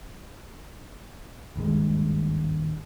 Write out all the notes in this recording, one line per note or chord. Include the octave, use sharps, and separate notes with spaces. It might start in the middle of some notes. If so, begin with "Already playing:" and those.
D#1 G#1 G2 G#3